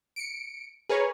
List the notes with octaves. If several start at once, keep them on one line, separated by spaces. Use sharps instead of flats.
C#7 D7
G#4 A#4 B4 C#5